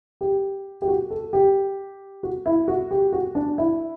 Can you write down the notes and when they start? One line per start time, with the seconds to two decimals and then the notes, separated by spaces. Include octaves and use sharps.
0.21 G4
0.82 G4
0.88 F#4
1.10 A4
1.33 G4
2.23 F#4
2.46 E4
2.68 F#4
2.91 G4
3.13 F#4
3.35 D4
3.58 E4